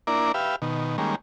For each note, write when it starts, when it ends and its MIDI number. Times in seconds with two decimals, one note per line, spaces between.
0.07 0.32 58
0.07 0.32 62
0.07 0.32 64
0.07 0.32 70
0.07 0.32 74
0.34 0.56 67
0.34 0.56 71
0.34 0.56 76
0.34 0.56 77
0.62 0.97 47
0.62 0.97 51
0.98 1.15 51
0.98 1.15 55
0.98 1.15 56
0.98 1.15 58
0.98 1.15 61